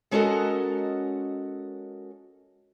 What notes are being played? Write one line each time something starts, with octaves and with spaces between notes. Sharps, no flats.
G#3 C#4 F#4 A4 A#4 D#5